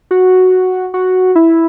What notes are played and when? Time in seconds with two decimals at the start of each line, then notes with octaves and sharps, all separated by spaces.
0.11 F#4
0.94 F#4
1.35 E4